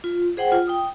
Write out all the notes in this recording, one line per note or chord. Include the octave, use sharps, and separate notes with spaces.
F4
G#4 C5 F#5 G5
F4
G5 D#6